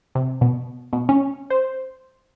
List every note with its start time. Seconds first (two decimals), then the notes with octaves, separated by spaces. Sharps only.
0.15 C3
0.41 B2
0.93 B2
1.09 C#4
1.50 C5